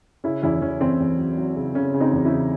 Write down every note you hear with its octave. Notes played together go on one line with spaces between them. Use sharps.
C#3 C#4 E4
E2 C#4 E4
E2 C#4
E2 C4
E2
F#3
F#3
C#3
C#3 C#4
C#3
C4 D#4
E2
C#4 E4
C#3